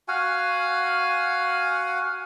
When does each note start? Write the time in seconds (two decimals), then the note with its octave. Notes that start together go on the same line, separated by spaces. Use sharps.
0.08 F#4 F5 F#5 G#5